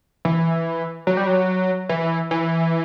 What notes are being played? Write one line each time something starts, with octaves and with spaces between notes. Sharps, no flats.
E3
F#3
G3
F#3
E3
E3